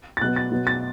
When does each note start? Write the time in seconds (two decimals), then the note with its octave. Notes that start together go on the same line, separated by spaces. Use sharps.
0.17 A6
0.21 B2 F#3 B3 F#6
0.36 A6
0.51 B2 F#3 B3
0.67 A6